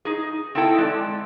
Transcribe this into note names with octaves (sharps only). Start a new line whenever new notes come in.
D#4 G#4
C4 D#4 E4 A4 G5
G#3 D5